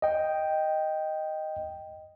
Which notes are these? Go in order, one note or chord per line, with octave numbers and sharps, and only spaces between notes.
D#5 G5